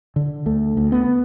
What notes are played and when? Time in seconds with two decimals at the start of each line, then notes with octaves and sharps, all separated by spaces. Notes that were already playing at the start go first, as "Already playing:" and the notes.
0.16 D3
0.46 D2 A3
0.77 D2
0.92 B3